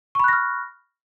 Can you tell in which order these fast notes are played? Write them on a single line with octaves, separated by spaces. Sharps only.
C#6 B5 F#6 A#6 F6